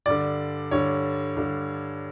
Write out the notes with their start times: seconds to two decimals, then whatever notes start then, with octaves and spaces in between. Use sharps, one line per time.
0.06 G2 D3 D5
0.71 G2 D3 C#5
1.37 G2 D3